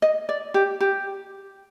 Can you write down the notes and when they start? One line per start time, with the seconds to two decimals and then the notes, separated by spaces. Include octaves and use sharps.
0.02 D#5
0.29 D5
0.54 G4
0.81 G4